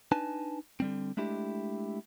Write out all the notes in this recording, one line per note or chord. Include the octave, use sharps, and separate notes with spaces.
D4 D#4 B4 G#5 A5
D3 G3 C4
G#3 A3 D4 E4 G4